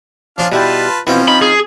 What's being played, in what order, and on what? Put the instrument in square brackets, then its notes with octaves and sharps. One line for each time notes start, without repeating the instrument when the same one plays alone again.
[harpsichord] F3 C#4 [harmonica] D4 F4 F5
[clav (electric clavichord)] B2 E4 G5 [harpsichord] G3 [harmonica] F4 B4 A5
[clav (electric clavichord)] B2 E3 E4 [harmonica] F3 C#4 [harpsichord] C4 F4 G5
[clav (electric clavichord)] D#4 [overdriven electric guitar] B5
[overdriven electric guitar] G#4